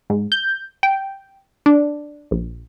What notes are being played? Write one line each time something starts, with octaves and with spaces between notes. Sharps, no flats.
G#2
G6
G5
D4
A#1